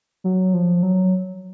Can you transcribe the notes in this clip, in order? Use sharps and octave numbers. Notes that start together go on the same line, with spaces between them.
F#3
F3
F#3